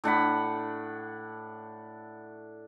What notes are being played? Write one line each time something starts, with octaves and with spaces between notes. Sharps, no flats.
A2 D4 F#5 B5